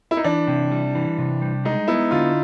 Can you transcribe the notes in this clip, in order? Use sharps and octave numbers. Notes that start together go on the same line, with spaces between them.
E4
D#4
E3 D4
C3
G3
E3
C3
G3
G#3 D#4
B3 E4
D3 F4